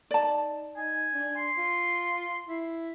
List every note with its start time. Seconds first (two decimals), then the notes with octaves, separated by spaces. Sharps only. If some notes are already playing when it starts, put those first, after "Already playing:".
0.11 D#4 D5 A5
0.77 D#4 G#5
1.13 D4
1.36 C6
1.57 F4
2.48 E4